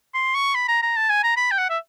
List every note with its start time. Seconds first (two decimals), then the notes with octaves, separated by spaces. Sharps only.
0.14 C6
0.35 C#6
0.55 B5
0.68 A#5
0.82 A#5
0.96 A5
1.10 G#5
1.24 A#5
1.37 B5
1.51 G5
1.58 F#5
1.70 E5